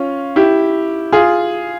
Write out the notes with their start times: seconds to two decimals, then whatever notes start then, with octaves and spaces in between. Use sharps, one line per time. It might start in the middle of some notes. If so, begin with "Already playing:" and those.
Already playing: C#4 F4
0.36 E4 G4
1.12 F4 G#4